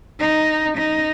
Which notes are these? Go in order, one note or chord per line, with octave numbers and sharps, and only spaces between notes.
D#4
D#4